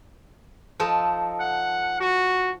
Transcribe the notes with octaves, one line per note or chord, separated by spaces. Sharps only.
F3 D#4 A4
F#5
F#4